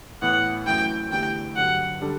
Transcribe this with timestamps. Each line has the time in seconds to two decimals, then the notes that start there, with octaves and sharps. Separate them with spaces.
0.22 A2 E3 B3 F#5
0.66 F#2 E3 A3 E4 G5
1.12 E2 D3 A3 E4 G4 G5
1.56 G2 D3 F#3 F#5
2.01 D3 G3 D4 A4